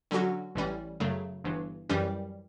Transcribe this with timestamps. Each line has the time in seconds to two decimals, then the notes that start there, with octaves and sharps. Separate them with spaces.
0.11 D3 F#3 C#4 F#4
0.55 A1 A2 E3 G3 C#4
1.00 F#2 C#3 F#3 A3
1.44 G1 G2 E3
1.90 F#2 E3 G3 C#4 G4